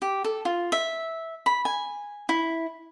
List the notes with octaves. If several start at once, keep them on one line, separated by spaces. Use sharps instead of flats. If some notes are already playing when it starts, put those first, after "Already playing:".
G4
A4
F4
E5
B5
G#5
E4